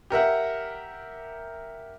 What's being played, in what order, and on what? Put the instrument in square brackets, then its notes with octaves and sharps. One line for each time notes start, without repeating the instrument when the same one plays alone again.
[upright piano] G4 A#4 E5 F#5